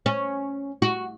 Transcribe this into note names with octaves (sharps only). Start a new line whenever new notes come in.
C#4
F#4